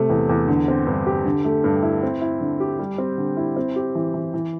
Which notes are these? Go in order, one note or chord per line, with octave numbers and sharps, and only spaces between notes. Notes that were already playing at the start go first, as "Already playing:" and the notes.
Already playing: C3 A3
E2
E2
D3
C4
G2
G4
D3
A3
G2
E4
C4
E4
D3
G4
G3
C4
D3
E4
C4
G4
E3
E3
E3